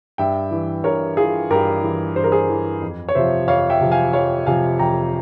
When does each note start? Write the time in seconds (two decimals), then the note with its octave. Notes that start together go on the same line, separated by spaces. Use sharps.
0.18 G2 E5 G5
0.51 E3
0.84 G2 A#4 C#5
1.17 E3 F4 G#4
1.50 G2 G4 A#4
1.83 E3
2.16 G2 C5
2.24 A#4
2.32 G#4 C5
2.49 E3
2.81 F2
3.09 C#5
3.15 C3 F3 C5 E5
3.47 F2 C#5 F5
3.70 E5 G5
3.81 C3 F3
3.92 F5 G#5
4.13 F2 C#5 F5
4.46 C3 F3 F5 G#5
4.79 F2 G5 A#5